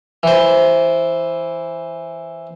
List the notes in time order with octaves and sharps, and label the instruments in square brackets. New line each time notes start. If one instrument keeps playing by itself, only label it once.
[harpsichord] E3 C5